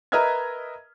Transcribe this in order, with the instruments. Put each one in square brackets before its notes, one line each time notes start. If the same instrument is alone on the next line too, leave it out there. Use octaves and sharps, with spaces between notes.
[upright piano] A#4 B4 D#5 E5 F6 G#6